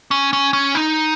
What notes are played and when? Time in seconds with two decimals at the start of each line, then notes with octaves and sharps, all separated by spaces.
0.11 C#4
0.33 C#4
0.53 C#4
0.75 D#4